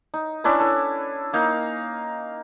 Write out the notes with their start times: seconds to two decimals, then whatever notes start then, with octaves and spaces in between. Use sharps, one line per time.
0.14 D#4
0.44 C#4 D4 E4 B4
0.60 A4
1.33 A#3 D#4 F5